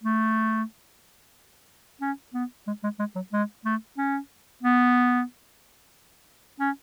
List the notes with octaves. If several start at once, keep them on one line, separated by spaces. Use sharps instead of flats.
A3
C#4
B3
G#3
G#3
G#3
F#3
G#3
A3
C#4
B3
C#4